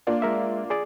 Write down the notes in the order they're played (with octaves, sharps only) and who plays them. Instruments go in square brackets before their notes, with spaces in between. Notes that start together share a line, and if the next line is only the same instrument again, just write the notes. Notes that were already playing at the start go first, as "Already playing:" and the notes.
[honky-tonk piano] A#3 D4 F4
[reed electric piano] G#3 A#4 E5
G#4 D5